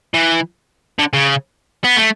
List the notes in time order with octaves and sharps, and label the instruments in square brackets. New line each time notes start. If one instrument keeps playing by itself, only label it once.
[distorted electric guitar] E3
D3
C#3
B3
A3